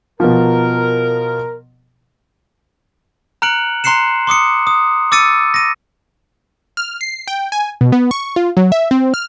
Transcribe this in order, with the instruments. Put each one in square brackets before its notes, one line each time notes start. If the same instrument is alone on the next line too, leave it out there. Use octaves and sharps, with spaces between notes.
[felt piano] B2 F3 [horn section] A#4
[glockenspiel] A#5 F6 F#6 C#7 D7 F#7
A#5 C6 F#6 C7 C#7 E7
C6 D6 D#6 C#7
D#6
D6 E6 A6 C#7 D#7
A#6 D#7
[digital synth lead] F6
C7
G5
G#5
B2
B3
C#6
F4
F#3
E5
C4
F6